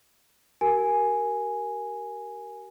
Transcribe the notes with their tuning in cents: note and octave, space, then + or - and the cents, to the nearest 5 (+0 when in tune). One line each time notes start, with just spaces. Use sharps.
G4 -40 A#4 +0 G#5 +0